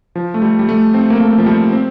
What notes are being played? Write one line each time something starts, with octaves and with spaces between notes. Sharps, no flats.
F3
A3
G3
G3
A3
C4
A#3
A3
F3
G3
C4